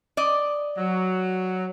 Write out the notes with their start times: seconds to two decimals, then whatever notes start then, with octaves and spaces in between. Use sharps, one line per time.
0.17 D5 D#5
0.78 F#3